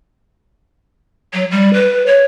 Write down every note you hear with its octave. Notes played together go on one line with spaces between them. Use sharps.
F#3
G3
B4
C#5